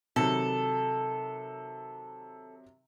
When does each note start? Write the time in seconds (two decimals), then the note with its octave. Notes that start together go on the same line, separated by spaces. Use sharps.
0.16 C3 D#3 F#3 A4